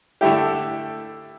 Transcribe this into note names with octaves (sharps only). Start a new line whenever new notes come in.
D3 A3 E4 G4